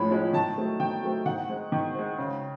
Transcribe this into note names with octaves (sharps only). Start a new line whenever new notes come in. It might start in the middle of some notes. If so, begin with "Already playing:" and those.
Already playing: A2 F3 G#3 C#4 B5
F3 G#3 C#4
D#3 A5
F#3 A3 C4
D#3 G5
F#3 A3 C4
D#3 F#5
G#3 C4
D#3
G#3 C4
C#3